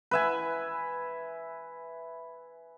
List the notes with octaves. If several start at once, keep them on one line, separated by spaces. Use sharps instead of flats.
B4 E5 G#5